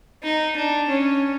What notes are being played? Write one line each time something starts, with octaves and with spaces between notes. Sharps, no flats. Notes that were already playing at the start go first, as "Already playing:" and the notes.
D#4
D4
C#4